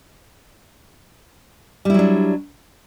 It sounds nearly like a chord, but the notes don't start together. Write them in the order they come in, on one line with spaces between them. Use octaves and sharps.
G3 E4 F#3 D4